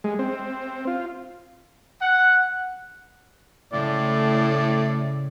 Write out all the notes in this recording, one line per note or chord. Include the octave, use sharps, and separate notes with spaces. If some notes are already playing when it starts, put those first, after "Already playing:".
G#3
C4
F4
F#5
A2 C#3 G#3 D5